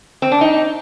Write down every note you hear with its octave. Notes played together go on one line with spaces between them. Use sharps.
C4
D4
D#4